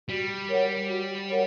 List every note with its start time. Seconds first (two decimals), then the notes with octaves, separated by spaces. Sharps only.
0.09 G3 F#4
0.48 A#4 C#5 F#5
0.89 F#4
1.29 A#4 C#5 F#5